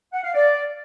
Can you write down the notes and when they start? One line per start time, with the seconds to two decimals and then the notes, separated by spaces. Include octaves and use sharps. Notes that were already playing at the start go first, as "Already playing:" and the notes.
0.13 F#5
0.24 F5
0.34 D5